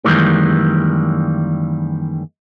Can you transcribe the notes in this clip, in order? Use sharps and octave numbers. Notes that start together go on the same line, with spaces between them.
F#2 D#3 E3 G3 G#3 A#3